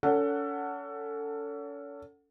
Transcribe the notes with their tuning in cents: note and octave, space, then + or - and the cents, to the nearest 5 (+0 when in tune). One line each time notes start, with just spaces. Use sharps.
C#4 +40 A4 +20 F#5 +0